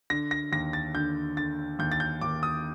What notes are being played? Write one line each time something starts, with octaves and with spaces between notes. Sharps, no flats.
D3 A#6
A#6
D#2 A#6
A6
D3 G6
D3 A6
D#2 G6
A6
G6
D#2 D6
D#6